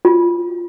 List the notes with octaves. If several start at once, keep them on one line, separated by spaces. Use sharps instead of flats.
F4